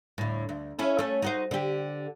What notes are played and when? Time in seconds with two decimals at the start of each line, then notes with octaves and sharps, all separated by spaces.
0.18 D2 A2
0.49 D2
0.79 C#4 E4 A4
0.99 A3 C#4
1.22 D#4 F#4 C5
1.51 D3 G4